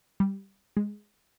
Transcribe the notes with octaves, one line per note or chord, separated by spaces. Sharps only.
G3
G#3